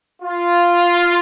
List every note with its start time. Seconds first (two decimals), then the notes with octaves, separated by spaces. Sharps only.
0.22 F4